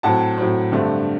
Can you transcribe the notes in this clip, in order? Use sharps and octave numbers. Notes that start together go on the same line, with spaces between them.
A2 F#3 C4 F#5 A5
A2 F#3 C4
G2 D3 A3 C4